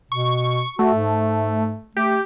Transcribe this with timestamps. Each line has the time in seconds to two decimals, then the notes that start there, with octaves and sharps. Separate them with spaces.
0.12 B2 C#6
0.79 A3 F#4
0.94 G#2
1.96 A3 G4